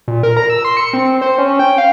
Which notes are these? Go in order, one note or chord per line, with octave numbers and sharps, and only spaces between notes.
A#2
A#4
A#5
E6
C6
C#7
C4
C5
C#4
G5
F5